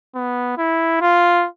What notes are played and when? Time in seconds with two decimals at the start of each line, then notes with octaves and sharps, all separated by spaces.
0.15 B3
0.58 E4
1.01 F4